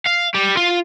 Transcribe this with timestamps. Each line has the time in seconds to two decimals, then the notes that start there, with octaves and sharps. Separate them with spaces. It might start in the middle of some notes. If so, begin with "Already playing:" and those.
0.06 F5
0.34 G3
0.57 F4